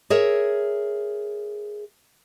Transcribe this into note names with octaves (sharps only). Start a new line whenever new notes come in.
G#4 A#4 C#5 E5